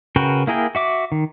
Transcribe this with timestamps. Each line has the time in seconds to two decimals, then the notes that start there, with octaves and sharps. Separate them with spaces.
0.16 C#3 F#4 A#4 B4 G5
0.47 A#3 E4 G#4 A#4 G5
0.75 F#4 E5 D6
1.12 D#3